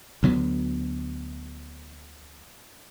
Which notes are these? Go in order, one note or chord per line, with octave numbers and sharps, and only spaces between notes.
D2 D3 F#3 B3